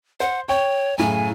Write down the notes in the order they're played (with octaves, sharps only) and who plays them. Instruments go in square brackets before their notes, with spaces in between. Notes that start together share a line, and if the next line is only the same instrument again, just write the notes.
[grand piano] C5 [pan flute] F#5
[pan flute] C#5 [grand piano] G5 C#6
[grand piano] F#2 A2 C#3 [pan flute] G#5